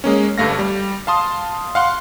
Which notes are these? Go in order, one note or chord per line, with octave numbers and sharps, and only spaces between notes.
G#3 A#3 C#4
G1 G2 A3 F5 A#6
G3
F5 A5 C6 D#6
F5 F#5 C6